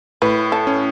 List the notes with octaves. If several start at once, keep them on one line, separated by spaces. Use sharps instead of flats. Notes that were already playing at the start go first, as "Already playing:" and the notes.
A2 B4
A4
C#4